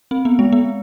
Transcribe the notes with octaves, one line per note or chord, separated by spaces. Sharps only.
C4
B3
G#3
B3